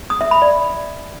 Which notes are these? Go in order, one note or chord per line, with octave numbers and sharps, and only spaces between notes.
D#6
E5
B5
D5